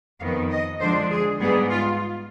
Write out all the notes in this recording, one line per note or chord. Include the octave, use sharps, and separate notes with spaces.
F2 D#3 B3 F5
D#5
D3 F3 G#3 D4 C5
G#4
G#2 G3 B3 G#4
F4